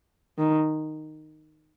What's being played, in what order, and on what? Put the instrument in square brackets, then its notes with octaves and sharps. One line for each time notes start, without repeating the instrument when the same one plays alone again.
[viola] D#3